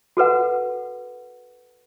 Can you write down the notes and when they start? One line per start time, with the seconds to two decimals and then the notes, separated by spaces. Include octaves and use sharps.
0.17 F#4 A4 B4 F#5